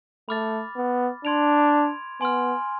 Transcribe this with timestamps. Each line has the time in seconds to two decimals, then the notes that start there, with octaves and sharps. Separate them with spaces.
0.29 A3 B5 D6 F6 A6
0.76 B3
1.24 D4 C6 G#6 D7 F7
2.21 B3 G#5 C6 F6